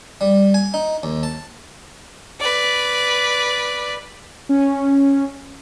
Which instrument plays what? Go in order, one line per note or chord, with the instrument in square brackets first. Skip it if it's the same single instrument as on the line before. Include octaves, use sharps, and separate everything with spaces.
[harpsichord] G3
G#5
D#4
D#2
A5
[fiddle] B4 D5
[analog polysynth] C#4